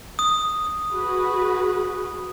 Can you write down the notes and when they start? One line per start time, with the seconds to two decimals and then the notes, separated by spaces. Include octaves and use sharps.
0.19 D#6
0.90 F#4 G#4 B4